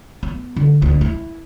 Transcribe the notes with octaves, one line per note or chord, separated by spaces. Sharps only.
B3
D3
D2
E4